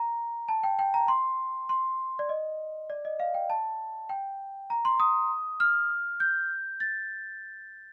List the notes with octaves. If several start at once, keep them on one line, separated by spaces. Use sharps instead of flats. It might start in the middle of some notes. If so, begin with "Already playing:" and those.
Already playing: A#5
A5
G5
G5
A#5
C6
C6
D5
D#5
D5
D#5
F5
G5
A5
G5
A#5
C6
D#6
F6
G6
A6